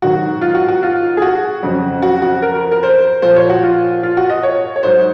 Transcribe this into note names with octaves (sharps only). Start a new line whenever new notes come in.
G#2 D#3 F#3 F#4
F4
F#4
F#4
F4
G#4
F#4
F2 C#3 F#3
F#4
F#4
A#4
A#4
C5
A#2 F3 C5
C#5
F#4
F4
F4
F#4
D#5
C#5
C#5
G#2 F#3 C5